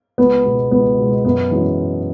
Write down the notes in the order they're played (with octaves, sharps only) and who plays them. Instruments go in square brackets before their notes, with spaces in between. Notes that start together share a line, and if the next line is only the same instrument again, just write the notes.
[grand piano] C#2 [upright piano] B3
[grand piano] B2 G#3
[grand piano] C#2 [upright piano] B3
[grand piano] B2 G#3
[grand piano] F#2 [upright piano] B3
[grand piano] E3 G#3 C#4 F#4